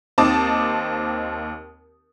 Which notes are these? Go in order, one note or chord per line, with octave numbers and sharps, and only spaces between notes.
D#2 C4 D#4 A5 D6 D#6